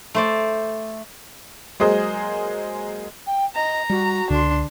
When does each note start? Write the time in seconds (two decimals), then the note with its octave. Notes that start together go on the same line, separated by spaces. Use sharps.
0.15 A3 C5 D5
1.80 F#3 G#3 A#3 G#4 C5 D#5
3.27 G5
3.55 D#5 A#5
3.90 G3 F#4
4.30 C#2 D3 D4 C6